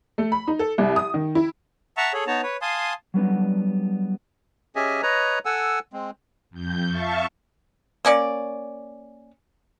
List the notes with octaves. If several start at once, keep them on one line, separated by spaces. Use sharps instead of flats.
A3
B5
D#4
A4
C2
D#6
D#3
E4
E5 F#5 A5 A#5 C#6 E6
G#4 A4 C#5
B3 D#4 C#5 A5 A#5
B4 C#5
F5 G#5 A5 C6 D#6
F#3 G3 B3 D4
C#4 G4 G#4 D#5 E5 G#5
B4 C#5 D#5 A#5
A4 F#5 G#5 E6
G#3 C4
F2 G6
E5 F5 A5 C#6
A#3 C#4 D5